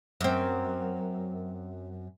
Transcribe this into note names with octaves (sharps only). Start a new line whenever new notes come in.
F#2 C4